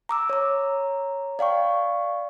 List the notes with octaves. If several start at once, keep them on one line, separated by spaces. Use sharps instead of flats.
A#5 D6 E6
C#5 A#5
D5 F5 G5 C#6